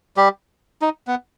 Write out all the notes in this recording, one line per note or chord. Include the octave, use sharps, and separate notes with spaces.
G3 G4
D#4
B3